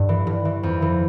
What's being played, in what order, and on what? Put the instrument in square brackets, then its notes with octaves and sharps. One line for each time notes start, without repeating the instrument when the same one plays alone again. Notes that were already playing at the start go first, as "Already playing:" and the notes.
Already playing: [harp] G2
E3
G2
E3
F2
E3